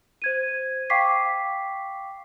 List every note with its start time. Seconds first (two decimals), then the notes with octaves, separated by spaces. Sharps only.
0.22 C5 G#6 D#7
0.90 F5 G5 C#6 D6 B6 C7